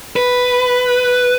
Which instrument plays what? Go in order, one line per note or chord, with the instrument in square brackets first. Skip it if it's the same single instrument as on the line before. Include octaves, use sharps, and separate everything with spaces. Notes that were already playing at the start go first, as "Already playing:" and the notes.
[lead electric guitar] B4